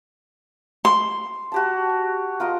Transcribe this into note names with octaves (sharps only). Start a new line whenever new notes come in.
C6
F#4 G4 A5
F4 A#4 D#5